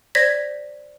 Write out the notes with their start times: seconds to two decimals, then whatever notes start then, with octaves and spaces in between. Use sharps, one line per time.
0.15 C5 D5 G#6 A#6 B6